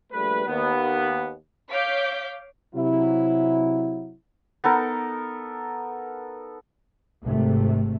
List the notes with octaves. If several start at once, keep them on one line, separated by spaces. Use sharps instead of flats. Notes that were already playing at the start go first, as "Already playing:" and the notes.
A#1 G3 A3 B4
D#2 B3
C#5 F5 D6 G6 B6
C3 F#3 E4
B3 D#4 A4 A#4
G#1 C3 A3